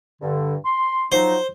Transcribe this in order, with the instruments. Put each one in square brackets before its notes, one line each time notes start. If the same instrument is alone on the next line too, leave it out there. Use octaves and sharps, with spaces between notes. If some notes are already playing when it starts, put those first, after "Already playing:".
[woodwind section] G2 D3
C6
[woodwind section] F3 F#3 D#4 [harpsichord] C5